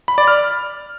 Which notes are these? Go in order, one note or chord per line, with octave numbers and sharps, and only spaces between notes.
B5
D5
F6